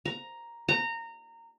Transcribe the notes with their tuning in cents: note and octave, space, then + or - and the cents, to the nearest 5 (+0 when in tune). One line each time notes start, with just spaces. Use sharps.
A#5 +5
A#5 -20